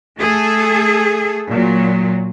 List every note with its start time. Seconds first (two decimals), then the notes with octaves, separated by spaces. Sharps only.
0.19 A3 G#4 A4
1.48 A#2 F#3